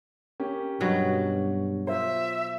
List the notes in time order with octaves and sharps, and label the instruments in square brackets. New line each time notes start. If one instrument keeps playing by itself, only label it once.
[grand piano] A#3 C#4 G4
[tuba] G2 [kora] B2 F#3
[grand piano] F4 C5 [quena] E5